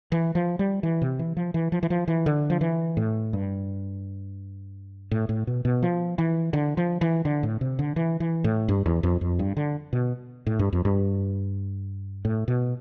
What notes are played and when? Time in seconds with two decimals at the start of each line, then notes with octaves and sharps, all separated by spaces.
0.12 E3
0.35 F3
0.59 G3
0.83 E3
1.02 C3
1.19 E3
1.37 F3
1.54 E3
1.72 F3
1.83 E3
1.90 F3
2.08 E3
2.26 D3
2.50 F3
2.61 E3
2.97 A2
3.33 G2
5.11 A2
5.29 A2
5.47 B2
5.65 B2
5.83 F3
6.18 E3
6.53 D3
6.77 F3
7.01 E3
7.25 D3
7.43 A2
7.61 C3
7.79 D3
7.96 E3
8.20 E3
8.44 A2
8.68 G2
8.86 E2
9.03 F2
9.21 F2
9.39 G2
9.57 D3
9.93 B2
10.46 A2
10.59 G2
10.73 F2
10.85 G2
12.25 A2
12.48 B2